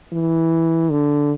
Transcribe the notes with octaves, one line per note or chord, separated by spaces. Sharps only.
E3
D3